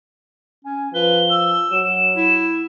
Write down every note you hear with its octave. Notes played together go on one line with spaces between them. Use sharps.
C#4 G#5
F3 B4 G7
E6
F#3 E7
E4